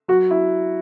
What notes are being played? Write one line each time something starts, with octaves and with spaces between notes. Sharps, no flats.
F#3 F#4
E4